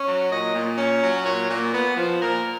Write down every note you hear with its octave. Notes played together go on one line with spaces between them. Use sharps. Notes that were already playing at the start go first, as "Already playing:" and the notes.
Already playing: C#4
F#3
A#2 D#5
A#2
C#4
F#3
A#2 C#5
A#2
B3
F3
A#2 A#4